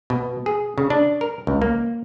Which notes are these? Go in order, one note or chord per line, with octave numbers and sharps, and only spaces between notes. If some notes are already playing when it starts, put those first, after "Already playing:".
B2
G#4
C#3
D4
A#4
C#2
A#3